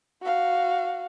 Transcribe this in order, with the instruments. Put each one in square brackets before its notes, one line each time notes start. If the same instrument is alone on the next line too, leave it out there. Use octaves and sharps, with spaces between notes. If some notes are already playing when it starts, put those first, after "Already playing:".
[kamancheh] F#4 F5